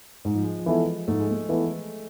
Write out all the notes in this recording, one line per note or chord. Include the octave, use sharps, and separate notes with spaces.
G#2 G#3
F3
G#3
F3
E3 G#3 B3 E4 A4
G#2 A3
G#3
A3
E3 B3 E4 A4